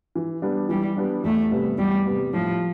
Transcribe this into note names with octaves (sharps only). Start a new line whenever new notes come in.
E3
G3 B3 D4
E3 G3
G3 B3 D4
E2 A3
C3 G3 B3
E2 G3
C3 G3 B3
A2 F3